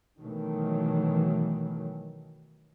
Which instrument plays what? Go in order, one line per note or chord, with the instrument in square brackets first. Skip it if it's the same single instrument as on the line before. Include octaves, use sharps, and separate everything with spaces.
[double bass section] B2 D#3 E3 F#3 A3